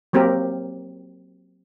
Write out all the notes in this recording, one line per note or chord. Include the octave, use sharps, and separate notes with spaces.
F#3 A#3 C4 G4 A#4